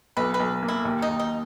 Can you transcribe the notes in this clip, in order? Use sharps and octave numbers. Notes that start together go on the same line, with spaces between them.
B1 B4
B4
B1
A#3
E4
D#2
D#4
D#2
D#4